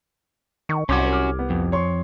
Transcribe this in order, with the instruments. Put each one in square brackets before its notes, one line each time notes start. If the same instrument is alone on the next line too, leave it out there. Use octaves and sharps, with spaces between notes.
[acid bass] D#3 [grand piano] C#6
[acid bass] C2 [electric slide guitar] C#4 F#4 [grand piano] C6 D6 G#6
[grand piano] D6 F6
B3
[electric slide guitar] F2
[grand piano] C#5 C6 C#6